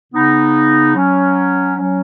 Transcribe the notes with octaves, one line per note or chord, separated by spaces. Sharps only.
C#3 B3 D#4
F#3 C#4
F#3 C#4